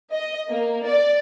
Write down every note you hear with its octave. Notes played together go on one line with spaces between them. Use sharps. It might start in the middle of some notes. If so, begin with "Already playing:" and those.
D#5
A#3
D5